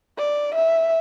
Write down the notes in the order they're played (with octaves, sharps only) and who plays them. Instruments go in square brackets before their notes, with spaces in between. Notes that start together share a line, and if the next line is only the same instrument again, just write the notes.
[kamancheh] D5
E5